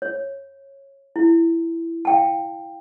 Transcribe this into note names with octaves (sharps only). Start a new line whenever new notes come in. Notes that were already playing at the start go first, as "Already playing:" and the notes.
C#5
E4
F5 G5 A5